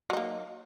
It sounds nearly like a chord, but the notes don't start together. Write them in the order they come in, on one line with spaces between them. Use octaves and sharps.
F#3 D#4 A#3